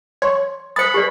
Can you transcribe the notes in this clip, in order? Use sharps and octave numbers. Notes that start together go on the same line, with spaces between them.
C#5 C6
C5 B5 D#6 A6 C#7
G4 B4 D5